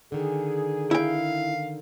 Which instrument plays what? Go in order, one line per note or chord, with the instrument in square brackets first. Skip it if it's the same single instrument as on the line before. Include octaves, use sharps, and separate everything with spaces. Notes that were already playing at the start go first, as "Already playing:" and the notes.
[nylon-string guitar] D3 D#3 [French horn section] G#4
[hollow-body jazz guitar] E4 G5 [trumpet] F5